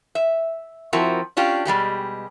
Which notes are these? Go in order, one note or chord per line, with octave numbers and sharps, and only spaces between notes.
E5
F3 C4 E4 F#4 A#4
C#4 D4 F4 G4
B2 G3 G#3 G4